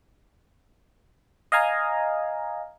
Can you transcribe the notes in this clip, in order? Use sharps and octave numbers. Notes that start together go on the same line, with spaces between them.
D#5 F5 G#5 A#5